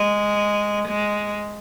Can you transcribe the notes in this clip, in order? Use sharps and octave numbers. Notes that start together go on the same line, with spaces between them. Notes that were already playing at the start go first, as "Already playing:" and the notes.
Already playing: G#3
G#3